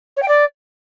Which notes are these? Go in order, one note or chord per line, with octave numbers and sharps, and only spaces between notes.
C#5
G5
D5